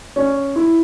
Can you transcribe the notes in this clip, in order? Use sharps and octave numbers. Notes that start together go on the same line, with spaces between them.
C#4
E4